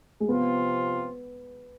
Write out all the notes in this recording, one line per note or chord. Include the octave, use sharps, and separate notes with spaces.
G#3
C3 F3 B3 C4 F4